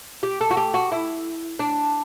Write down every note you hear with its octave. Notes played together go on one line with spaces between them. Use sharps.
G4
A4
F#4
G4
F#4
E4
D4